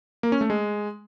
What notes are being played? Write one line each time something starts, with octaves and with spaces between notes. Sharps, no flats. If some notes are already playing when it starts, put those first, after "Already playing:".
A#3
C#4
A3
G#3